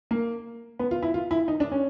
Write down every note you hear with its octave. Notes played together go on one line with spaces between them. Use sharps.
A#3
B3
F4
E4
F4
E4
D#4
D4
C#4